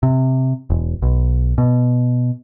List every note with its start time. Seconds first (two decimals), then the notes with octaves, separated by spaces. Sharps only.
0.03 C3
0.70 E1
1.02 B1
1.58 B2